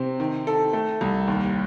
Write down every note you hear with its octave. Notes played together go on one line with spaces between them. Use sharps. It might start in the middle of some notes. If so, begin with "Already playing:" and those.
Already playing: C3 C4
D#3
A4
A3
C2
D#2